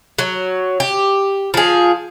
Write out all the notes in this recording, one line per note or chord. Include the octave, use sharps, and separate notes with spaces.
F#3
G4
F3 G#4